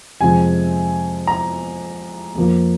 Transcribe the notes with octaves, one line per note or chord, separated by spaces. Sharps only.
F2 C3 F3 G#3 C4 G#5
A#5
F2 F3 A#3